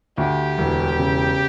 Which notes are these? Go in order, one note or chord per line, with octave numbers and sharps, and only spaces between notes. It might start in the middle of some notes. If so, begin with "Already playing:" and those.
D2 G4
E1
C#3